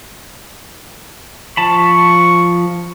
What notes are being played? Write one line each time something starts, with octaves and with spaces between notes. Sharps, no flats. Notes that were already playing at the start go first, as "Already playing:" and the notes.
F3 A5 B5 C#6